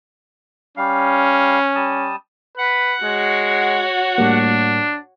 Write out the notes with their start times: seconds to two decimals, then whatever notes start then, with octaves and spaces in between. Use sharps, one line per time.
0.77 G3 C#4 F5
1.75 G3 A5 D#6
2.58 B4 F#5
3.04 G#3 F#4 C#5
4.18 A2 G3 A#3 D4